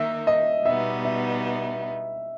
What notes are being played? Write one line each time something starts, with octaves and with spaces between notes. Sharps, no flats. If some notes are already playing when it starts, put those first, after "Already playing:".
Already playing: D#3 A#3 D#4 A#4 E5
D#5
B2 G3 B3 D#4 E5
E5